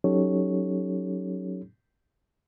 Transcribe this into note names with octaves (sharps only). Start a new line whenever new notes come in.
F#3 C#4 D#4 G4 A4 C#5